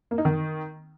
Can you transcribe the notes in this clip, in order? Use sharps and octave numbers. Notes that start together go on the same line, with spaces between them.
A#3
D#4
D#3